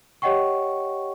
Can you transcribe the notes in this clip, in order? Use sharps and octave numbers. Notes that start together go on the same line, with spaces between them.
G4 C#5 D#5 F#5 G5 C#6